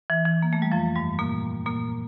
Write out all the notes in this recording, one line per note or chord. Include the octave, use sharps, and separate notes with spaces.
E3
E3
A#3
A3
G3
F2 F3
G2 G3
A#2 A#3
A#2 A#3